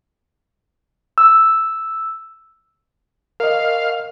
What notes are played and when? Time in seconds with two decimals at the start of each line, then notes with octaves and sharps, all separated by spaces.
1.18 E6
3.40 A#4 D#5 F5